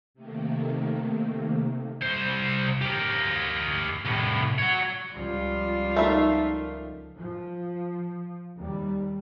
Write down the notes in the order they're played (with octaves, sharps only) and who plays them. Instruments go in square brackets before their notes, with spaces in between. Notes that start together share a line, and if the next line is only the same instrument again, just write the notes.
[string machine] C3 D#3 A3 A#3
[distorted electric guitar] C2 C5
G4 A#4
C2 A2
C#5 F#5
[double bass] C#2 F3 [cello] G3 F4
[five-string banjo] A3 E5 [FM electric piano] D#4 A#4
[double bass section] F3
D#2 G3